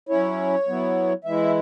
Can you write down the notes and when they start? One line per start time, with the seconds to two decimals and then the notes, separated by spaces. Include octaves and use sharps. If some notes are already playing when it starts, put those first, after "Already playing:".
0.09 F#3 C#4 E4 C#5
0.67 F#3 B3 E4
1.24 E3 G#3 E4 E5